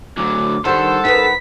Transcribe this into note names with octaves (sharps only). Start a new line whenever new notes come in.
D2 F#3 D6
D#3 G3 D4 A4 C5 F#5
D#4 A#4 B4 B6